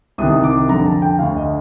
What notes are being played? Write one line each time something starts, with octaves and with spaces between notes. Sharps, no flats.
C2 C3 D#3 D#6
D6
F2 D3 A#5
A5
G5
D2 D3 F5
D#5